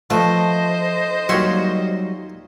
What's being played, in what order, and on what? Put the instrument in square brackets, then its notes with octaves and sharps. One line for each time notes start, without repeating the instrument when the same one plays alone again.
[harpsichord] F3 B4 [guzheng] A3 [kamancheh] C5 D#5
[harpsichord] D#2 F4 C6 [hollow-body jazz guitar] F#3 G3 [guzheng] C#5 E5 G5